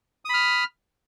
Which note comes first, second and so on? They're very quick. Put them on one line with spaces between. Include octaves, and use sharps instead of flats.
D#6 B5 F6